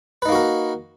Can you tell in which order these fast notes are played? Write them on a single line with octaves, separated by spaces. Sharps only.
B4 D#4 A#3 F#4 A#4